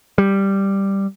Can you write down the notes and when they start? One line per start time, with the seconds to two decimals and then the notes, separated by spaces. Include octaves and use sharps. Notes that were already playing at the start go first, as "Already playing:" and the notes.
0.18 G3